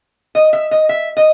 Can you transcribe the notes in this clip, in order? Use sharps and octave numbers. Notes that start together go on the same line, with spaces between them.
D#5
E5
D#5
E5
D#5